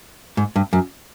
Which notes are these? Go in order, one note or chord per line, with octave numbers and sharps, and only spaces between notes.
G#2
G2
F#2